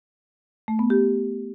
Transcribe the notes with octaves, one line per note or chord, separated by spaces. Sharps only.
A3
B3
G4